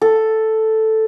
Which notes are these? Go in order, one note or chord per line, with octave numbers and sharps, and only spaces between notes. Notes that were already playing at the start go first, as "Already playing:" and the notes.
A4